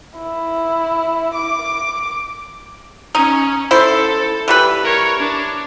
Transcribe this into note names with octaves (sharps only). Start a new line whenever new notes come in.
E4
D6
C#4 D#4
E4 A4 C5
E3 G3 B4
A#4 C#5
D4